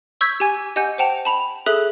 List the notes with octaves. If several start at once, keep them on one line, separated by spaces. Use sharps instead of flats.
C#6 E6 G6 G#6 B6
G4 G#5 G#6
G4 D#5 F#5 G#5 G6
C5 F#5 G5 A5 F7
A5 B5 F7
G#4 A4 E5 D#6 F#6